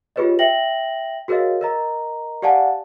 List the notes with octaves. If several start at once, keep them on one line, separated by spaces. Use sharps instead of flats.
F4 G4 G#4 B4 C#5 D#5
E5 G5 A#6 F#7
F#4 G#4 A#4 C#5 D#5 F5
A#4 D#5 A#5
G4 D5 F5 F#5 G#5 A5